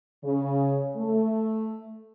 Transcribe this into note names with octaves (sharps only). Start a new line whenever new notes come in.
C#3
A3